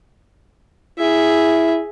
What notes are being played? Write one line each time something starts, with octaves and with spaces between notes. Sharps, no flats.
E4 G#4 E5